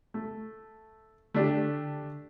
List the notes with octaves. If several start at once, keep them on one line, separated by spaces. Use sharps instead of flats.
A3
D3 A3 D4 G4